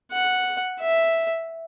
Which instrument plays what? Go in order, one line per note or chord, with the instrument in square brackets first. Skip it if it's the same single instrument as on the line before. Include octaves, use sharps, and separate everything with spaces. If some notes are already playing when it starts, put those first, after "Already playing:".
[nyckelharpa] F#5
E5